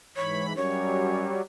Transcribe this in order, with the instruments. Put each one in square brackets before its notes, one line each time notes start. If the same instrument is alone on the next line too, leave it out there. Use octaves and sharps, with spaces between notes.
[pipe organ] G#2 E3 B5 [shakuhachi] C#5
[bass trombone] F#2 [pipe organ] F#3 G3 [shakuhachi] C#5